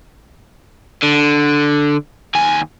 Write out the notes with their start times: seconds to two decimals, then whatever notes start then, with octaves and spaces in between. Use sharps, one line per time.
1.03 D3
2.35 D#2 G#5